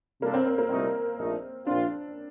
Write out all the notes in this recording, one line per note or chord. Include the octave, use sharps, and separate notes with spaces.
C3 G3 A#3 D4 F4 A4
C4
C4
A#3
C2 A#2 A3 C4 D#4
A#1 A#2 A3 D#4
A#1 A#2 F3 C4 D4 F4